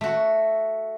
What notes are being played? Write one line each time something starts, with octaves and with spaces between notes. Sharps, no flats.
A3 F#4